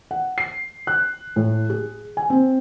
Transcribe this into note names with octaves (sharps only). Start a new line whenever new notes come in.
F#5
C7
F#6
A2
G#4
G#5
C4